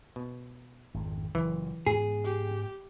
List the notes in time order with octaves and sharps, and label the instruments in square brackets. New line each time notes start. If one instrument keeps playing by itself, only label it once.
[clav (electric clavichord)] B2
[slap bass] G#1 F2
[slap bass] F#1 F#2 A#2 [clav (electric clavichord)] E3
[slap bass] G#2 B3 [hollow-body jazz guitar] G#4
[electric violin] G4